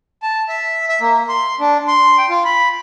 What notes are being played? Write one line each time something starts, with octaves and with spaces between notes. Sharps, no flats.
A5
E5
E5
A#3
C6
D4
C6
G5
F4
B5